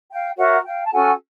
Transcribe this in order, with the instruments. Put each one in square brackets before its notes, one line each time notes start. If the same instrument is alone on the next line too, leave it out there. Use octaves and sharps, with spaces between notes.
[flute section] F5 G5
F#4 A#4 C#5 E5 F#5
F5 G5
A5
C#4 F#4 A4 F#5 G#5